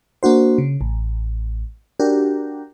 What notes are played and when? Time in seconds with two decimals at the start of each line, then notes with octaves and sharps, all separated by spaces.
0.23 A#3 D4 F#4 C5
0.58 C#3
0.81 A1
2.00 D4 F#4 G4 A#4